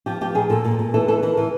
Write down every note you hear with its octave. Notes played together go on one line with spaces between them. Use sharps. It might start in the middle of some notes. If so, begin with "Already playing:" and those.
F3 G4
F3 G4
A#2 G#4
A#2 A4
A#2
A#2
E3 A4
E3 A4
E3 A#4
E3